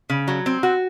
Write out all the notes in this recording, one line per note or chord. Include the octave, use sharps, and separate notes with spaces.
C#3
F#3
C4
F#4